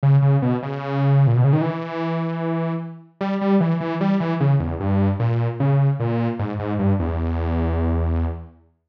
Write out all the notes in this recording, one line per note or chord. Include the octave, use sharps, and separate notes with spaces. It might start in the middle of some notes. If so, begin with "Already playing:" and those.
C#3
C#3
B2
C#3
A#2
B2
C#3
D#3
E3
G3
G3
E3
E3
G3
E3
C#3
E2
G2
A#2
C#3
A#2
G#2
G#2
G2
E2